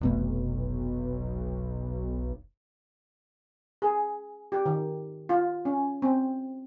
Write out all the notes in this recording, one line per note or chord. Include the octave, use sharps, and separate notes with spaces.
F1 B1 B2 A3
G#4
G4
D#3
F4
C#4
C4